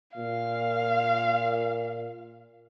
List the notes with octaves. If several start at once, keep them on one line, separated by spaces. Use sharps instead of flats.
A#2 F5